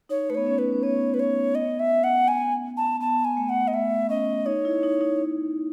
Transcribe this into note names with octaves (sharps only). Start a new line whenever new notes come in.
D#4 C#5
A3 B4
B3 C#5
C#4
B4
C#4
B3 C#5
B4
C#5
D#5
E5
F#5
G#5
A5
B3 A5
G#5
A3
F#5
D#5
A3 E5
C#4 D#5
D#4 C#5
E4
D#4
D#4